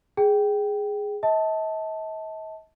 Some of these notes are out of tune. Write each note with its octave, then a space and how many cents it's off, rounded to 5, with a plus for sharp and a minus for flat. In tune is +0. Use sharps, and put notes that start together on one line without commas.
G#4 +0 G5 -10
D#5 +45 A5 +0